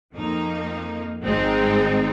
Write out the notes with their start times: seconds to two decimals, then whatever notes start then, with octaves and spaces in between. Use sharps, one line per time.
0.14 F2 F3 A#3 D#4
1.23 G#1 G#2 G#3 C4 D#4